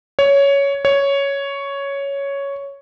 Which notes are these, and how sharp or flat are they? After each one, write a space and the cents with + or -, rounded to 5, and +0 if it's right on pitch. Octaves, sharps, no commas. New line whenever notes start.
C#5 +10
C#5 +5